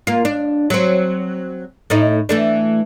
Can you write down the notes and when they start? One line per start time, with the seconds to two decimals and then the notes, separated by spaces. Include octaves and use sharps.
0.07 A#3 F4
0.25 D4
0.70 F#3 C4
1.90 A2 A3 D#4
2.29 E3 A3 D4